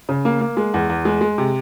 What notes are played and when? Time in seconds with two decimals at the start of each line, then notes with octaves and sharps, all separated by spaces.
0.09 C#3
0.25 A#3
0.41 A#3
0.57 G#3
0.74 E2
0.90 E2
1.05 G#3
1.21 G#3
1.38 C3